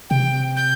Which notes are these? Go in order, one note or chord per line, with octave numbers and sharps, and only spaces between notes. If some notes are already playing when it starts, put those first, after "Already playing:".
C3 G5
G6